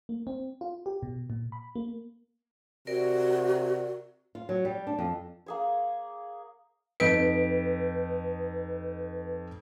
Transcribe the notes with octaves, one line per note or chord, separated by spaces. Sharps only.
A#3
C4
F4
G4
B2
A#2
B5
A#3
C3 F#4 A#4 D5
F4
F#3
G3
D4
F2
A#3 G#4 C#5
F2 D#4 B4 D7